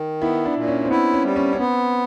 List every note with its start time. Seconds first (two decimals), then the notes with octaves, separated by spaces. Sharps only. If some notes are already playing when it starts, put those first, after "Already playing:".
Already playing: D#3
0.22 B3 E4
0.45 D4
0.56 A#2
0.67 C#4
0.85 C4
0.91 B3 E4
1.14 C#4
1.25 G3
1.36 C#4
1.53 C#4
1.59 B3 C4